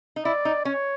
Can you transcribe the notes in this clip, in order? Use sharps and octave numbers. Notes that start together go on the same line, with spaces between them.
D#4
E4 D5
D#4
C#4 C#5